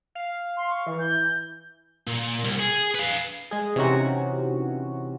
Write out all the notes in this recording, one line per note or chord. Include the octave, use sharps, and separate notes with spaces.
F5
C6
C#6
E3
G6
A#2
C2
G#4
B4 F5
G#3 G#4
C3 E3 C4 C#4 D#4 F#4